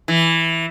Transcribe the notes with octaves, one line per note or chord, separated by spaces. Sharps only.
E3